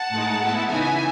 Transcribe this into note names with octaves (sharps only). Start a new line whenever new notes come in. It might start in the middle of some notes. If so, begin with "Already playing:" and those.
Already playing: F#5 A5
A2 G#3 D#4
A2 G#3 B3 E4
C#3 E3 B3 D#4 E5 G#5